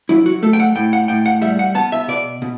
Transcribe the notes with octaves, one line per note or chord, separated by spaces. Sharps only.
F#3 E4
F#4
A3 A4
G5
F#5
A2 G5
F#5
A2 G5
F#5
G3 E5
F#5
B3 A5
E5
B2 D5
B2